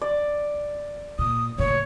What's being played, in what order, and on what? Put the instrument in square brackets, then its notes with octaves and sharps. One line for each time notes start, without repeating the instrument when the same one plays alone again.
[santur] D5
[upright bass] A#2 [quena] D#6
[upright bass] F#1 A2 [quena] C#5